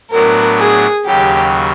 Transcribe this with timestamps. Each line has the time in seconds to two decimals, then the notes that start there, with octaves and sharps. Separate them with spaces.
0.11 A2 F#3 B3 D4 A#4
0.59 G#4
1.05 D#2 C#3 F#3 G4